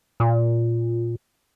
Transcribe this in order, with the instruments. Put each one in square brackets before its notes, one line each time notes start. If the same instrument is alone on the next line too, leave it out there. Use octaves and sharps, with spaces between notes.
[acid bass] A#2